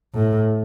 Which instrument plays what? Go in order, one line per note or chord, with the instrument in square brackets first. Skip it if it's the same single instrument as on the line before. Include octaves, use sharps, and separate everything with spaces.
[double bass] A2